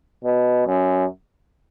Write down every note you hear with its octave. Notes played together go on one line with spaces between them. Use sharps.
B2
F#2